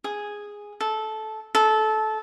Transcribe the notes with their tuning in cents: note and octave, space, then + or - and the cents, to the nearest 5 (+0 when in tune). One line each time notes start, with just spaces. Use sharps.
G#4 -5
A4 -15
A4 -20